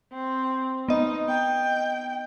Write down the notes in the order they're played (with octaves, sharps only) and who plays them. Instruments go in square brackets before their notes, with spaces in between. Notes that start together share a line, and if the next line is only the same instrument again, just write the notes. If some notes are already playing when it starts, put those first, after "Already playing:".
[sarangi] C4
[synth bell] B3 D#5 [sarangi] D#4
[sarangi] G5